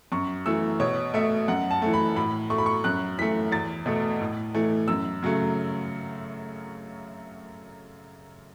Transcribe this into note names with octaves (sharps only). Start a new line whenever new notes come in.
F#2 C#6
E3 A3 E6
B2 C#5
A3 E5
F#2 F#5
A5
E3 A3
B5
A2 B5
A3 C#6
B5
C#6
F#2 F#6
E3 A3 B6
E2 A6
B2 A3
A2
E3 A3
F#2 E6
C#3 F#3 A3